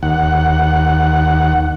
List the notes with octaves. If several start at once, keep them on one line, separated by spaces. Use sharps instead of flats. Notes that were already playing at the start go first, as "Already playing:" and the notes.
D#2 F#5